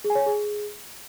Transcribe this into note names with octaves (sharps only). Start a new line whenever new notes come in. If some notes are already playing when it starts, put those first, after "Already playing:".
G#4
G#5
C#5
G#5
G#4